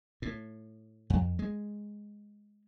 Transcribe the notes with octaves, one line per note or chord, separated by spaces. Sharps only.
A2
F2
G#3